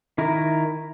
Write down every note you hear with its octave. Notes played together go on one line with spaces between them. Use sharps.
D#3 E4 A#4